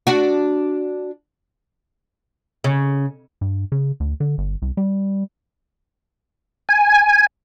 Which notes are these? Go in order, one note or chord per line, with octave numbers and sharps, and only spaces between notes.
D4 F#4
C#3
G2
C#3
D2
D3
G1
C2
G3
G#5